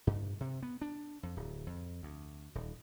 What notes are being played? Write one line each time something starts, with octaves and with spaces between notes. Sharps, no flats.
G2
C3
B3
D4
F2
D1
F2
D2
D#1